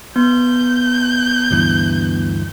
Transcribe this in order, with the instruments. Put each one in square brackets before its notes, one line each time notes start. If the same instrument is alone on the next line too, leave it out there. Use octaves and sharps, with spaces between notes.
[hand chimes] B3 [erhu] G6
[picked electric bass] D2 G2 E3